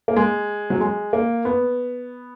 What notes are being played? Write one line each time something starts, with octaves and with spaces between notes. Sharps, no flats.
A#3
G#3
F#3
G#3
A#3
B3